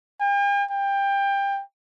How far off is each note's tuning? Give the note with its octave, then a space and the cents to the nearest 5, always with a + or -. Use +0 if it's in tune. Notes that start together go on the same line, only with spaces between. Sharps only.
G5 +45
G5 +20